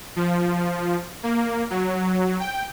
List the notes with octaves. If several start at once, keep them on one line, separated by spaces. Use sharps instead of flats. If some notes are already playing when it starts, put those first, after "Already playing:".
F3
A#3
F#3
G5